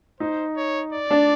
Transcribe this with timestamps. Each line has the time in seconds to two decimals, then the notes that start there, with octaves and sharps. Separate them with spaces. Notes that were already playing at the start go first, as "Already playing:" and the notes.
0.20 D#4 C5
0.57 C#5
0.93 D5
1.11 D4